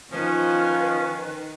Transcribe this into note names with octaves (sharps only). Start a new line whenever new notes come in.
D#3 F3 C#4 B4